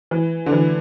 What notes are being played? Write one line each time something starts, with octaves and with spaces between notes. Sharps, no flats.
E3
D3
E3